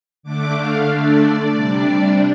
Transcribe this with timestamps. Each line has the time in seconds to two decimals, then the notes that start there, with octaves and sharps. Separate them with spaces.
0.23 D3 A3 D4 D6
0.56 F5
0.88 D5
1.53 C3 G3 D4